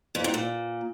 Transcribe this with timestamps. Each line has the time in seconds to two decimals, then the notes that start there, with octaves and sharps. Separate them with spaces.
0.15 F2
0.24 G#2
0.34 A#2